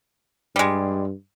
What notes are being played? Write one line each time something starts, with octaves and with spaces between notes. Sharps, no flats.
G2 G3 G#3